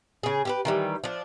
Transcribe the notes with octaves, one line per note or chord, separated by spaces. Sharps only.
C#3 G#4
G4 A#4 B4
D#3 E3 G3
F3 D4